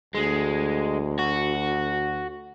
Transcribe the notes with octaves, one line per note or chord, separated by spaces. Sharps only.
D2 G#3
F#4